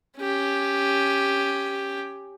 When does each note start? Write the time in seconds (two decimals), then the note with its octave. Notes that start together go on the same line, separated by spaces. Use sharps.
0.18 C#4 G4